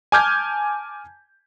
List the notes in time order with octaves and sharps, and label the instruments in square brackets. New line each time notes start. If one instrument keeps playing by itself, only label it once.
[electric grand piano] G#5 A5 D6 F6 G6 G#6